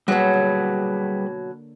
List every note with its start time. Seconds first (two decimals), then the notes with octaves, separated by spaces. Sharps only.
0.08 B2 F#3 G3 A#3 G#4 B4 C#5
0.33 D3